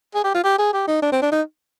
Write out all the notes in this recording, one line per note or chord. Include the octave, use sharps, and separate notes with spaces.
G#4
G4
F4
G4
G#4
G4
D#4
D4
C4
D4
D#4